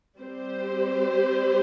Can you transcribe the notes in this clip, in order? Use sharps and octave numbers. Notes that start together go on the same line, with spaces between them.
G3 C4 G4 C5